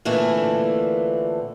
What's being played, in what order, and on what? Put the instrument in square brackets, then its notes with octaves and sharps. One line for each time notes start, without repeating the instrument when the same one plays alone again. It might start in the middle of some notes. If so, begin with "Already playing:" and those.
[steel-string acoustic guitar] A#2 D3 E3 A3 C4